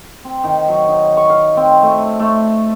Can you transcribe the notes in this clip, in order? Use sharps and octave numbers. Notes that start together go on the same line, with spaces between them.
C4
D#3
F#3
D#4
C#6
F5
C4
A3
A3